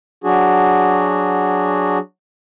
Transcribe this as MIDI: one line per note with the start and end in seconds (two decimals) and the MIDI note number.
0.24 1.98 54
0.24 1.98 62
0.24 1.98 66
0.24 1.98 68